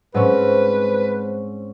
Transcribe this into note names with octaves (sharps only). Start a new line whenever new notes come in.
G#2 C4 C#4 B4